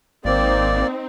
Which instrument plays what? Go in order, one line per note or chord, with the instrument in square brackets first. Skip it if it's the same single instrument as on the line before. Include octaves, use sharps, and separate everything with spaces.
[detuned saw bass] G#1 [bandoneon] A#3 D5 [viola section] C4 D#4